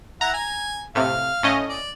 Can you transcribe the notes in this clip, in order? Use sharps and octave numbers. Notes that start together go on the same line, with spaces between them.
E4 F#5 A#5
G#5
A2 C3 F5
A2 C#4 D#5
D5